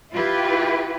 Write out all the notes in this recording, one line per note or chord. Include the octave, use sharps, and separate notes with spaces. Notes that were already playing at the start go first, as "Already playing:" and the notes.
E4 F4 G4 B4